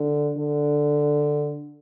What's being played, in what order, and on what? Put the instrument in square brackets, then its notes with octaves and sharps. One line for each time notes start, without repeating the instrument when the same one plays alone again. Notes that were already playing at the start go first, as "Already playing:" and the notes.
Already playing: [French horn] D3
D3